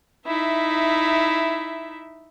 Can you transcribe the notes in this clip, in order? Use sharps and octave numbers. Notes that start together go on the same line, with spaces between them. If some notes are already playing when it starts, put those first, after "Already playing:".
D#4 E4 E5